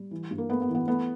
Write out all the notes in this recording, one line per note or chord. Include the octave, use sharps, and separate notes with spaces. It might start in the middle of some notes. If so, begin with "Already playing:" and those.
Already playing: G3
E3
G2
A#3
A3 B3
B3
E3
B3
A3 B3